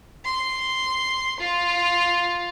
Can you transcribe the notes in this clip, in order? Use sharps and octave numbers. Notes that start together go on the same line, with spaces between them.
C6
F4